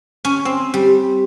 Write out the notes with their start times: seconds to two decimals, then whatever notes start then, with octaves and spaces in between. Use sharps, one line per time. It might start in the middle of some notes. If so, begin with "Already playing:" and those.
0.25 C#4
0.45 C4
0.74 G3